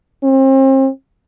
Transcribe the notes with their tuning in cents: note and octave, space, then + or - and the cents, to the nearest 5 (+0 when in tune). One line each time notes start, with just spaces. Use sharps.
C4 +35